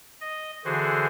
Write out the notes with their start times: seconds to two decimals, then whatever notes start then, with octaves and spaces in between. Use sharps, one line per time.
0.21 D#5
0.65 D3 E3 F#4 G#4 C5